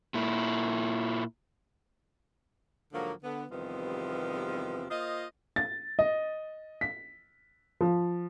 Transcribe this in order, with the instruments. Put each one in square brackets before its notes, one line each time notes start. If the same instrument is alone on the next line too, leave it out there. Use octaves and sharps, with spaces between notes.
[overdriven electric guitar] A#2 E4
[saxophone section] G#2 D3 F3 F#3 A#3
D3 B3
E2 C3 D#3 F3 G3 B3
A#3 F4 C5 D#5
[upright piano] A6
D#5
B6
F3